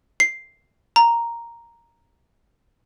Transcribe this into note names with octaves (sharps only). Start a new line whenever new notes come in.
C7
A#5